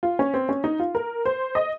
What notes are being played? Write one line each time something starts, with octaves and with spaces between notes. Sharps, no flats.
F4
C#4
C4
C#4
D#4
F4
A#4
C5
D#5